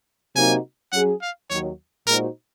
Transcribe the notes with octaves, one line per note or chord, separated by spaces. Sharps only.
C3 F#3 A#3 D#4 F#4 G#5
F#3 C#4 G#4 F#5
F5
D#2 D#3 F#3 C#5
A#2 G#3 D#4 F#4 A#4 C5